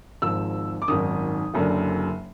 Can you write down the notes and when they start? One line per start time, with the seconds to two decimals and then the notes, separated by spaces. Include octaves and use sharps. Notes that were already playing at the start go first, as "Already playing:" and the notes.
0.22 G#1 G#2 F3 E6
0.82 D6
0.88 G#1 F#2 D#3 D#6
1.54 F#1 F#2 D3